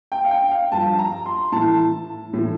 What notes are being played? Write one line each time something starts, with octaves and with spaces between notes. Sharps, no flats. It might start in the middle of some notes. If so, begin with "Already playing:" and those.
G5
F5
G5
F5
G2 F3 A5
A#5
C6
A2 E3 A5
A2 E3